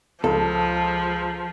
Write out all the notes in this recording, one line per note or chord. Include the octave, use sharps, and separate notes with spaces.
C#2 F3 A4